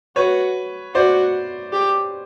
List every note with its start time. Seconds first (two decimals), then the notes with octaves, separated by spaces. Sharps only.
0.16 F#4 B4 C#5
0.95 F#4 C5 D5
1.73 G4